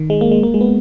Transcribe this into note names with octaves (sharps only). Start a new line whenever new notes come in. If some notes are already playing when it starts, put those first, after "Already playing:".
Already playing: D#3
G#3
A#3
G#3
A#3
G#3
B3